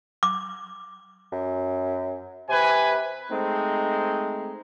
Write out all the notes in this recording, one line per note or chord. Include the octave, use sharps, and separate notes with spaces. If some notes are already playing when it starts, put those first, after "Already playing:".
D6
F#2
C3 B4 G#5
G#3 A3 C4 D#4